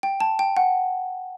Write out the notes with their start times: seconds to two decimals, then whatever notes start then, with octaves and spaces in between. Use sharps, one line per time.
0.03 G5
0.20 A5
0.39 G5
0.57 F#5